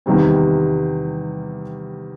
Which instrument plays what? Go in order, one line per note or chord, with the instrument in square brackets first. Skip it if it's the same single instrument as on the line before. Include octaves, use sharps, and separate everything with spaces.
[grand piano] E2 C3 D#3 G3 C4